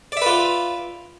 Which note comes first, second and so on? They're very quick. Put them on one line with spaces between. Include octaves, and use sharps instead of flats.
D5 E5 B4 F4